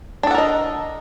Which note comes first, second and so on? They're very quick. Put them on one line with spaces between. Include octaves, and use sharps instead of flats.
D4 A4 F#5 A#4 D#5